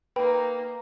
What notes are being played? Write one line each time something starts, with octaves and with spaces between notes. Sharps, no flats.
A#3 D#4 B4 G5